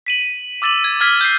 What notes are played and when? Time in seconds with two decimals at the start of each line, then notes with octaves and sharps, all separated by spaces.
0.06 B6 D#7 F#7
0.62 D6 E6 A6 D#7 F#7
0.84 G#6
1.01 E6 F6 G#6 B6
1.21 G6 C7